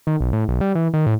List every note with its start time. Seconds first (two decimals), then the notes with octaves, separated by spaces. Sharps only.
0.07 D#3
0.20 B1
0.33 A2
0.48 B1
0.61 G3
0.75 E3
0.93 D#3
1.06 A2